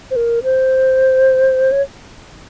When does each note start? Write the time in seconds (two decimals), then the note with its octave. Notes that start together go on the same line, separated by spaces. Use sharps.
0.11 C5
0.16 A#4
0.43 C5
1.72 C#5